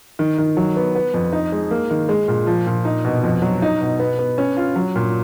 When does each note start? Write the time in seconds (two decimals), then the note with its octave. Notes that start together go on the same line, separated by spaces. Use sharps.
0.19 D#3
0.38 D#3
0.57 F#3
0.77 B3
0.95 B3
1.14 F2
1.33 D#4
1.52 G#3
1.71 A#3
1.90 D#3
2.09 G#3
2.28 A#2
2.47 F3
2.67 A#2
2.85 D#4
3.05 B2
3.24 F2
3.42 F#3
3.62 D#4
3.81 B2
3.99 B3
4.19 B3
4.38 C#4
4.57 F4
4.76 F#3
4.96 A#2